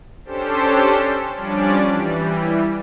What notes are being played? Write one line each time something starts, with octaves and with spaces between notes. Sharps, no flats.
C#4 D4 G4 A4 C5
F3 G3 C#4 D4 D5
E3 G3